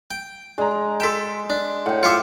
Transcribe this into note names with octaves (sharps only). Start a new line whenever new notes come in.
G5
G#3 D4 A#5
A4 G5 C6 B6 E7
D4
A2 F#5 G5
F4 C5 E5 D6 C#7